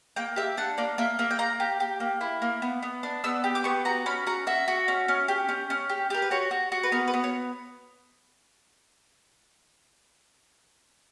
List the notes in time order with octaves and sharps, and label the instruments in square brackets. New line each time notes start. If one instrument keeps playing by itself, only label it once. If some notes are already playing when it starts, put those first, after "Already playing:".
[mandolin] A#3 G5
G4 E5
D4 F#5
A#3 D5
A#3 E5
A#3 E5
G5
A#3 A#5
G4
G4
A#3
E4
A#3
B3
B3
D4
B3 E6
G4
D6
B3 C#6
F#4 A#5
C#4 B5
F#4 A#5
F#4 E5
F#4
C#4
C#4
G4
C#4
C#4
G4
G4 A#4
B4
F#4 C#5
F#4
F#4
B4
B3 A#4
B4
B3
C#5